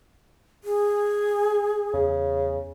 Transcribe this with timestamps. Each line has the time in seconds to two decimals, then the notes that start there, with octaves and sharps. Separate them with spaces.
0.64 G#4
1.94 E2 C#3